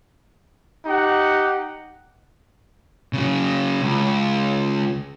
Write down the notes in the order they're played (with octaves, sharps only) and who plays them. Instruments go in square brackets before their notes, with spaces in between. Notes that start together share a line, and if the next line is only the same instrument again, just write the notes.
[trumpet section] D#4 G4 F#5
[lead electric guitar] C#3 F#3
C#2